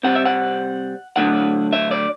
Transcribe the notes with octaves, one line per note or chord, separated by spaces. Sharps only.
C3 G3 C4 F#5
E5
F#5
D3 F#3 A3 D4 F#5
E5
D5